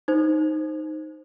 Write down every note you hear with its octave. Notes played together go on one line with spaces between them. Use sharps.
D#4 C5